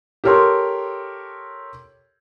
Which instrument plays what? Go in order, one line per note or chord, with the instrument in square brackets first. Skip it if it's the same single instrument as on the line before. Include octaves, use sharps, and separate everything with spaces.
[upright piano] G4 A4 A#4 C#5 C6